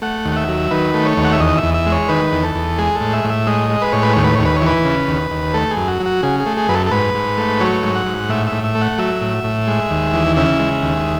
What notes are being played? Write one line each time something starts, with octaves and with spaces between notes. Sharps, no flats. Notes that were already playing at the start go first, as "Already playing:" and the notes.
A3 F#5
D#2
F#5
E5
F#3
D#3 B4
A3
C#5
D#2
F#5
E5
E2 D#5
E5
E2
E5
G#3
C#5
D#3 B4
E2
A4
E2
G#3 G#4
A4
A2
E5
A2
E5
G#3 D#5
G#3
B4
A2 C#5
B4
D#2 C#5
B4
D#2 C#5
B4
C#5
E3 B4
C#3
D#2
D#2
A3 A4
G#4
F#2
F#4
F#3
F#4
C#3 G#4
G#4
A3
G#4
F#2 B4
A4
A4
G#2 B4
G#2
A3
F#3 C#5
G#2
F#5
G#2
A2 E5
E5
A2
E5
A3
F#5
F#3 E5
A2
A2
G#3
D#2
E3
C#3 E5
G#3
D#2